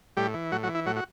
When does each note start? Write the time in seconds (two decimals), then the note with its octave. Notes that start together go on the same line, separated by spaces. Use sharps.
0.17 A2 G3 G4
0.34 E3
0.52 A2 F#3 F#4
0.63 F#3 F#4
0.69 E3
0.75 E4
0.86 A2 F#3 F#4
0.96 F#4